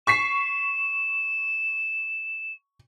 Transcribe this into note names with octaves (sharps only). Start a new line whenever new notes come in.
C#6 B6 C7 E7